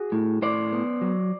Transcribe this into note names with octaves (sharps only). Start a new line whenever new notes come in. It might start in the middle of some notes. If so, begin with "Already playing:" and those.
Already playing: F#4 G#4
A2
A2 C5 D5
B3
F#3